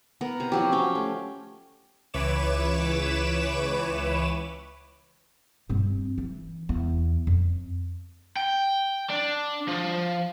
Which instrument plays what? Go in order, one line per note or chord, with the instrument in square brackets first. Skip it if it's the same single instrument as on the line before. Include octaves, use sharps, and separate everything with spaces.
[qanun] B3 A#4
C3 A#5
F3 F#3 G4
C#4 F5 G5
A3
[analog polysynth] C#2 E3 B4 C#5 D6 E7
[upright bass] G2 C4
E3
E2 B3
F2
[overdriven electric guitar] G5
D4
F3